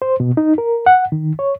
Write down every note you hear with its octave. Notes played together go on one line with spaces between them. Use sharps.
C5
B2
D#4
A#4
F#5
D#3
C#5